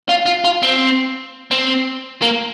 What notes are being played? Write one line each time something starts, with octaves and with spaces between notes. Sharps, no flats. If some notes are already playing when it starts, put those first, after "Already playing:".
F4
F4
F4
C4
C4
A#3